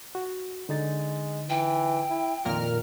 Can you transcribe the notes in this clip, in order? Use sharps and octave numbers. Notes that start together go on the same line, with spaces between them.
F#4
D3 G#3 D#4 A6
E3 G5
E4
F2 A#2 D#3 F4 A#4 F6